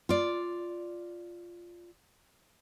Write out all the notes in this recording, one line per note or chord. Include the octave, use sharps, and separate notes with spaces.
F4 D5